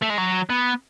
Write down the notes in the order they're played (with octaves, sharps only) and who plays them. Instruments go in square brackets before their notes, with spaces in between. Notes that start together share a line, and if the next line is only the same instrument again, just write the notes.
[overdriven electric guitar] A3
G#3
F#3
B3